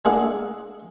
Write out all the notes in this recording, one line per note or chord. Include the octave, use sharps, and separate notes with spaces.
G#3 A#3 D4 E4 G#4 F#5